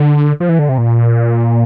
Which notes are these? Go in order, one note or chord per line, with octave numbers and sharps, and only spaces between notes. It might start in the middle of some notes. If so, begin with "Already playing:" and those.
Already playing: D3
F3
E3
D3
C3
A#2